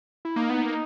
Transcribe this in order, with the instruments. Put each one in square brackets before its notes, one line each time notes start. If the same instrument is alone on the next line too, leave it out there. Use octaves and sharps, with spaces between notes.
[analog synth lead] E4
[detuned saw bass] A#3 [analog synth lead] D#4
[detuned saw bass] B3
A#3
[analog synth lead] D#4